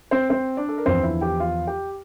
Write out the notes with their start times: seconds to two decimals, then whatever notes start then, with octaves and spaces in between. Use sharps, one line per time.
0.11 C4 C5
0.30 C4 C5
0.57 D4 D5
0.69 A4
0.78 A#4
0.86 E2 D3 F3 C4 C5
1.03 E4 E5
1.21 G4 G5
1.40 F4 F5
1.67 G4 G5